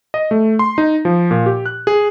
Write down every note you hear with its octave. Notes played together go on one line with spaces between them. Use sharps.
D#5
A3
C6
D#4
F3
A#2
G4
F#6
G#4